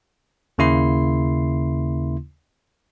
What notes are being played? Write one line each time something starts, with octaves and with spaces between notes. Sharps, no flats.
D#2 C#3 A#3 E4 C6 C7